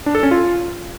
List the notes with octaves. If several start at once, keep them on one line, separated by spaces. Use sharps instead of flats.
D4
A4
C#4
F4